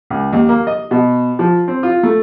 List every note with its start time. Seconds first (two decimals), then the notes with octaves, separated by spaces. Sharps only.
0.10 C#2
0.33 D#2
0.49 A#3
0.67 D#5
0.91 B2
1.39 F3
1.68 C4
1.83 F4
2.03 A3